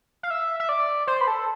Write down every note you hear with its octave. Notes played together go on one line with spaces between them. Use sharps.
F5
E5
E5
D5
C5
B4
A4